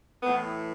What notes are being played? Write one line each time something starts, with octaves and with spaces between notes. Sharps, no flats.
A2 E3 B3